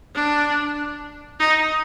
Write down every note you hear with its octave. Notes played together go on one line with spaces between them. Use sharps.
D4
D#4